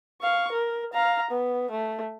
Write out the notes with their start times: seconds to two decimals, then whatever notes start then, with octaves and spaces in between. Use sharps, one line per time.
0.22 F5 C#6
0.52 A#4
0.93 F5 A#5
1.31 B3
1.71 A3